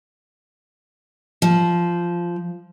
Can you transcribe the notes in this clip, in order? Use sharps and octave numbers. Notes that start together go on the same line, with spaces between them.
F3